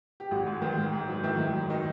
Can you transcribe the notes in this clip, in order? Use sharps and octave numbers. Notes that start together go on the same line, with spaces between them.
G4
G#1 F#4
G#2
D#3
G#2
G#2
F#3
D#3 E4
D#3
F#3
D#3 D#4